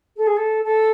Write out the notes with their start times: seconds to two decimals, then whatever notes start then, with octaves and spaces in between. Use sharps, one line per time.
0.16 A4
0.27 G#4
0.37 A4
0.64 A4